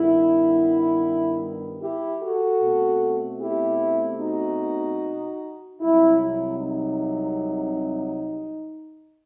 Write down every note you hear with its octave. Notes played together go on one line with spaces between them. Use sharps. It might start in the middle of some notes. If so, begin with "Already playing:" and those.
Already playing: G2 D#3 G3 B3 E4
E4 G4
F#4 A4
B2 A3 C4
E4 G4
D#4 F#4
C2 C3 F#3 E4
E4
D#4